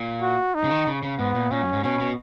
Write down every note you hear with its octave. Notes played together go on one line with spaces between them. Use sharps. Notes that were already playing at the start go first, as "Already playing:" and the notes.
Already playing: A#2
F#4
D#4
C#3
D#3
C#3
C#3
G#2 B3
A#2
A#2 C#4
F#2
G#2
B2 C#4
B2